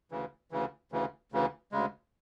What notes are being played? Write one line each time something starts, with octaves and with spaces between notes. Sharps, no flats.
D2 C#3 E3
D2 C#3 E3
D2 C#3 E3
D2 C#3 E3
D2 C#3 G#3